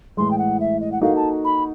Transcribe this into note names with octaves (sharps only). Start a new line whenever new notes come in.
A2 E3 G#3 C6
G5
F#5
E5
D#5
F#5
A#3 D#4 F#4 A4 F5
A5
B5